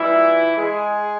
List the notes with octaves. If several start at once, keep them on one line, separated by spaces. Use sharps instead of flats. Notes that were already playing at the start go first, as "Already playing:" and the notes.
Already playing: A#2 E3 G3 E4
G#3 G#4